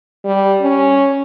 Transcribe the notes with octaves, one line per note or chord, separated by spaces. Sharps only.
G3
C#4